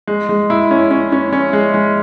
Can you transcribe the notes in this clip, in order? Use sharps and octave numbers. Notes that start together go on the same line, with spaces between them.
G#3
G#3
E4
C#4
C#4
C#4
C#4
G#3
G#3